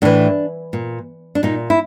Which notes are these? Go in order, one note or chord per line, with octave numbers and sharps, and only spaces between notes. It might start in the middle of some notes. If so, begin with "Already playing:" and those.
A2 E3 D4
A#2
D4
A#2 D#4
E4